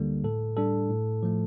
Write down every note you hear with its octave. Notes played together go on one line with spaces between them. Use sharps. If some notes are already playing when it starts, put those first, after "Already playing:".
Already playing: D2 D3 G3 A#3 A4
A2 A4
G3 D4 A4
A2
F3 A3